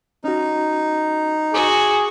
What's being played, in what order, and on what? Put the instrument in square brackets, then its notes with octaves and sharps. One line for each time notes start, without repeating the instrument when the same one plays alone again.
[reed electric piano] C#4 F#4 [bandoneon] D#4
[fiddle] F#4 [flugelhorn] G#4 [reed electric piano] D6